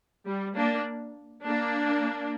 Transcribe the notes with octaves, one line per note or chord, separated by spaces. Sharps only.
G3
A#3 D4
A#3 D4